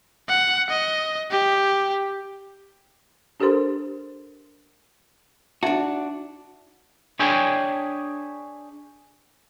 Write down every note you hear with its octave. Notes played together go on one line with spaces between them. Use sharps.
F#5
D#5
G4
D4 G4 A4 A#4 C5 C6
D4 D#4 F#4 E5 A5
D4 G#4 C#5 E5 G5 G#5